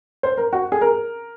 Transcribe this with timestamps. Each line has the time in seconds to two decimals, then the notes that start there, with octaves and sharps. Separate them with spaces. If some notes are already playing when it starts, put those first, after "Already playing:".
0.23 C5
0.37 A#4
0.53 F#4
0.72 G#4
0.81 A#4